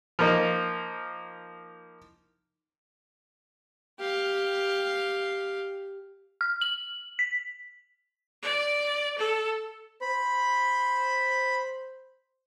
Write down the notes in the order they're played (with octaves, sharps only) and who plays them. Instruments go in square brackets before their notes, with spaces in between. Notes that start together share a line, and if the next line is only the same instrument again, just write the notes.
[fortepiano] F3 A#3 D#4
[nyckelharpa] G4 F5
[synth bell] F6
F#7
B6
[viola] D5
A4
[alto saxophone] C5 [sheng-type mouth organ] B5